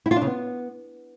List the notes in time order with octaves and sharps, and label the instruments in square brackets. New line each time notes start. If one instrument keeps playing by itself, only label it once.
[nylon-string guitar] E4
F4
D4
C#3
B3